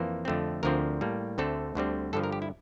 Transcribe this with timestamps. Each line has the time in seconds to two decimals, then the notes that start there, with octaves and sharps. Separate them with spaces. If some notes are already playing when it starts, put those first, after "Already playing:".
Already playing: F2 E3 A#3 C5
0.25 F2 D3 A3 C4
0.63 D2 D3 F3 C4 A#4
1.01 A2 G3 A#3
1.38 D2 D3 A3 C4 A4
1.75 D2 D3 G3 C4
2.13 G2 D3 F3 A4
2.24 A#4
2.32 G4
2.42 E4